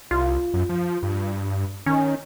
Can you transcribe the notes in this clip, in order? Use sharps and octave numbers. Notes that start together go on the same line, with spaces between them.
C2 F4
F#2
F3
G2
D#3 C#4